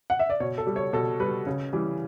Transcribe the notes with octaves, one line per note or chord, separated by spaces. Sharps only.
F#5
E5
D5
B2 C#5
A4
G3
C#5
B2 A4
G3 B4
C#3
E3 G3